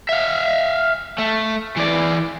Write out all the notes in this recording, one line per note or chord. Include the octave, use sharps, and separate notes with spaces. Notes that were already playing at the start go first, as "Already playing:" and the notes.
E5 F5
A3
E3 D5